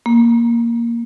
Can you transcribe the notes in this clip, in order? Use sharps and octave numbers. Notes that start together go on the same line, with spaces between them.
A#3